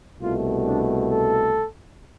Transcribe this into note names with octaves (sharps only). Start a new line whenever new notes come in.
C2 B2 A3 F4
D4
A4